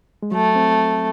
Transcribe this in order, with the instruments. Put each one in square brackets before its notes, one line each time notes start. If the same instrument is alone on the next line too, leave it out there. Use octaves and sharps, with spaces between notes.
[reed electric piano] G#3
[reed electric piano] F#3 [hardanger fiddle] A3
[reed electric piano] C4